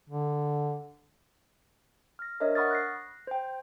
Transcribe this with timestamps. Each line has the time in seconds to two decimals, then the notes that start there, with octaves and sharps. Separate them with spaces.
0.09 D3
2.19 F6 A#6
2.40 D4 A#4 C5 C#5 D#5 E5
2.55 F#5 B5 C#6 D#6 F6 A6
2.71 F#6 A#6 C7
3.27 C5 G5